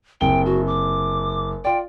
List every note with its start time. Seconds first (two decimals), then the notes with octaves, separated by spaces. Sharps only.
0.21 F#1 C3 G5 G7
0.46 F#4
0.67 D6
1.65 F4 D5 G5